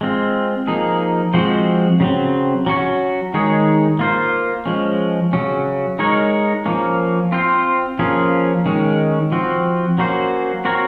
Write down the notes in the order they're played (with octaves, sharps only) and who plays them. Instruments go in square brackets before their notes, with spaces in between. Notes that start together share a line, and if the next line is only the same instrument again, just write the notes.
[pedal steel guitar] G#3 C4 F4
F3 A#3 D#4 G#4
F3 G#3 C4 F#4 C5
C#3 F#3 C4
F#3 C#4 F#4 C#5
D#3 G#3 D#4 G#4 C#5
A#3 F4 C5
F3 G#3 C#4
C#3 F#3 C#4
G#3 D#4 A#4 C#5
F3 A#3 C#4
C4 F4 C5
F3 A#3 C#4 F4 G#4
D#3 G#3 C#4
F3 C4 F#4
F#3 A#3 C#4 F#4 C5
C4 F#4 A#4 C#5